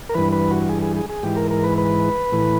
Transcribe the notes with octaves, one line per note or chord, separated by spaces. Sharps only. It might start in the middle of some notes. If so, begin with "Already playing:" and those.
A#4
G2 E3 B4
B4
F#4
G#4
G#4
G#4
G#4
G#2 E3 G4
A#4
A#4
B4
B4
A2 E3